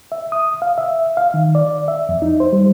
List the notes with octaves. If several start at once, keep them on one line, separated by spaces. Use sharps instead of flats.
E5
D#6
F5
E5
F5
D#3
D5
E5
F2
D#4
C5
G3